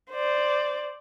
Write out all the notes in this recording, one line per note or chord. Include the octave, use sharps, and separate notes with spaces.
C5 D5